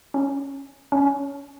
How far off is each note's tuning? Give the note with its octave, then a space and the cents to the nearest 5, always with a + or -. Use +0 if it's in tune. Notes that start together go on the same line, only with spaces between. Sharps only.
C#4 -5
C#4 +15